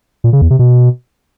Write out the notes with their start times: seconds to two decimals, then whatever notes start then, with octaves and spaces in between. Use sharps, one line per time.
0.24 A#2
0.33 C#3
0.42 E2
0.50 C3
0.59 B2